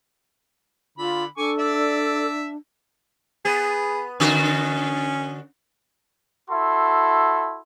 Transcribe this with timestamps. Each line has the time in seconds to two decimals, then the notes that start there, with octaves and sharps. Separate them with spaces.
0.98 D3 F4 B5
1.37 D4 A4 G#5 C#6 D6
1.58 D5 E5
3.45 B3 G#4
4.20 D3 C#4 F#4
6.50 E4 F#4 A4 C6